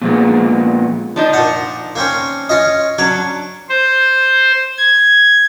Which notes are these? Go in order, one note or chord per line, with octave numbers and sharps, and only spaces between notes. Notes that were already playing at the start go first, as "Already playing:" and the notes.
A#2 F3 G#3 B3
F3 D4 D#4
A#2 F#5
A#3 C4 C#4
C#4 F4 D#5
F#3 C#4 D4 C#5 D6
C5
G#6